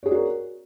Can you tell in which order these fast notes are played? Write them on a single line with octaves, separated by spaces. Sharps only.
C#5 G#4 D5 F#4 A#4